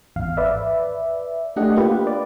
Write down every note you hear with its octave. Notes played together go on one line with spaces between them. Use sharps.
G#1 E2 F5
B4 D5 E5
A3 D4 G4 D#5 F#5
A#3 F4 G4 B4
D5